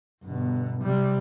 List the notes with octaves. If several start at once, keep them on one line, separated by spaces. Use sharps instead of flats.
G1 B2
C3 G3